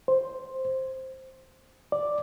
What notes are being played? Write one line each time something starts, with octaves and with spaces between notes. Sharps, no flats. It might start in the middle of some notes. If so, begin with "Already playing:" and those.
C5
D5